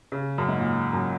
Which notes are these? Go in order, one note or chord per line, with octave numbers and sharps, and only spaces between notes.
C#3
F#2
G#2
A#2
F#2